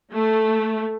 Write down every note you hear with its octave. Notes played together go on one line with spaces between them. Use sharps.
A3